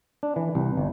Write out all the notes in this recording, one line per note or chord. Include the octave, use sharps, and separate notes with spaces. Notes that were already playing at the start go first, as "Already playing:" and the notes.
D4
E3
C2
G1